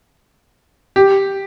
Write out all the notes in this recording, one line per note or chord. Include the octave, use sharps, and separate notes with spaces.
G4